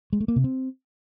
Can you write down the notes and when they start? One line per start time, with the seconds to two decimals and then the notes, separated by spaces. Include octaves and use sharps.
0.13 G#3
0.20 A3
0.28 A#3
0.36 C3
0.44 C4